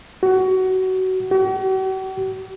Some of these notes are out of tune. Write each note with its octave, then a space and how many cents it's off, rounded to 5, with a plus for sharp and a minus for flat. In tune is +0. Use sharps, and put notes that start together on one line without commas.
F#4 +20
F#4 +45